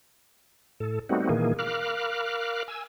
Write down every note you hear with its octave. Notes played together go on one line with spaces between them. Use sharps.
A2 A4
G3 A3 B3 C4 D#4 F#4
A#2 D#3 E3 A#3 G#4
A#4 F5 B5 D6 F6 F#6
G#5 E6